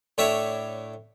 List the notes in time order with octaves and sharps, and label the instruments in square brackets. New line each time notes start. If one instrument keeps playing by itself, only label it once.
[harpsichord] A2 D4 C#5 E5